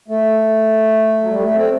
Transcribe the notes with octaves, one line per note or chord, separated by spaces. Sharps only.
A3
F#3
G3
A3
C4